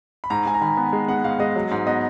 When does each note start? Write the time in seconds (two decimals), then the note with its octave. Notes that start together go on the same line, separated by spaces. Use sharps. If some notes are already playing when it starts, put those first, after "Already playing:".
0.24 B5
0.30 G#2 A#5
0.46 G#2 G#5
0.54 A#5
0.61 D#3 B5
0.77 B3
0.93 G#3
1.08 B3 F#5
1.24 G#2 F5
1.39 G#3 D#5
1.55 F#3
1.71 G#2
1.87 B3 D#5